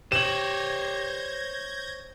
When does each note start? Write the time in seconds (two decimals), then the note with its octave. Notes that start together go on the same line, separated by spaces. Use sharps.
0.12 G4 C5 C#5 G6 G#6 A#6 E7 F#7